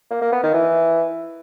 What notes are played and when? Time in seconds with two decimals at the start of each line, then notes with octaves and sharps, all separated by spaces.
0.11 A#3
0.21 A#3
0.32 B3
0.43 D#3
0.54 E3